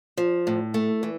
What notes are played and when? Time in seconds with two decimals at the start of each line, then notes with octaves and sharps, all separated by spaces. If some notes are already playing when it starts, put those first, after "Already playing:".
0.17 F3
0.47 A2
0.74 A3
1.03 E3